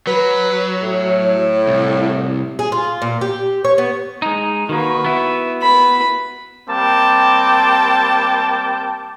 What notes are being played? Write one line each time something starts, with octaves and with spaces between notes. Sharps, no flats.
F#3 B4
A2
C2
G#4
F4
A#2
G4
C#5
B3
G#3 D#4
D#3 A#3 F#4 B4
B3 E4
B4 B5
G3 A#3 C4 G5 A5 D6